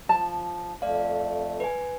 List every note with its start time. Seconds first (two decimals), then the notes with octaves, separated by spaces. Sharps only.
0.09 F3 A5
0.82 F2 A3 D5 F5
1.60 B4 G#5